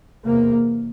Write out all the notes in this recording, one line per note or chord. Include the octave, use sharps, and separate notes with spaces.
E2 C3 A#3